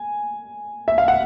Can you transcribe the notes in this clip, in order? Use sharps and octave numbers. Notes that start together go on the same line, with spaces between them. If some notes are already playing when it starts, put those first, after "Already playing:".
Already playing: G#5
E5
F5
F#5